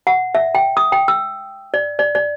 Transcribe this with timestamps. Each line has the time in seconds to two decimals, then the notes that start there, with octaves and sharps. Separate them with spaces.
0.07 F#5
0.35 E5
0.55 G5
0.77 D#6
0.92 G5
1.08 E6
1.74 D5
1.99 D5
2.15 D5